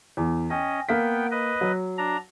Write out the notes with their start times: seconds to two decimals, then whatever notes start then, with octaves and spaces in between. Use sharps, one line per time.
0.17 E2
0.50 C#4 D#5 G5
0.89 A#3 B3 F5 G5 B6
1.31 B4 D#5
1.61 F#3
1.98 D4 A#5